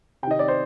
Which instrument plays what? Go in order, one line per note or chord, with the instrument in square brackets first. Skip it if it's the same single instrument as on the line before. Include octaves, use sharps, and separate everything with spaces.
[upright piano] C3 G5
D#3 D#5
D5
C5